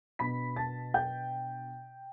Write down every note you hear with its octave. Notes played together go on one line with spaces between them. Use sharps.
B2 B3 D4 B5 B6
A5 A6
G5 G6